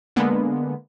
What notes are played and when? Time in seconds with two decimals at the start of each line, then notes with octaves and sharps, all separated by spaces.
0.16 D3 G#3 A#3 B3